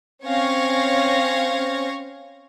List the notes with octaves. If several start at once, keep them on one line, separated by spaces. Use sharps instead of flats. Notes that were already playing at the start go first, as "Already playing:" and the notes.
C4 C#4 F5 C#6 G#6 A#6